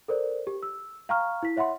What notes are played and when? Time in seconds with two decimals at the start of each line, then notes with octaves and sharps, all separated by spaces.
0.08 A4 A#4 C5 D5
0.47 G4
0.63 E6
1.09 F5 G5 A#5 C#6 F6
1.43 E4 B6
1.57 C#5 E5 F#5 B5 C6